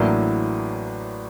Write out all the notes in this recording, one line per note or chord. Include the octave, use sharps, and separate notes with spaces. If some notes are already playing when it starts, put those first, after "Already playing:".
Already playing: A1 A2 F#3 A#3 D4